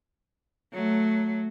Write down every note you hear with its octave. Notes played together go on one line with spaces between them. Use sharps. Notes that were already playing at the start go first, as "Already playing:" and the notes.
F#3 A3